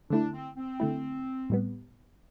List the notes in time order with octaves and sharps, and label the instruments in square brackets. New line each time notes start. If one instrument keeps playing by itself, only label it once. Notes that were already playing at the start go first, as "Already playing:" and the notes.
[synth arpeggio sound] D3 A3 E4 [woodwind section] D4
[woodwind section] C4
C4
[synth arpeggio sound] D3 A3 E4
A2 G3 B3